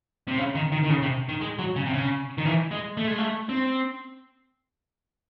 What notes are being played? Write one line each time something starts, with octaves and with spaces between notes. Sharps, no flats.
C3
C#3
D#3
D#3
D#3
C#3
C3
D#3
G#3
F#3
C#3
C3
C#3
D#3
E3
G#3
A3
G#3
A3
C4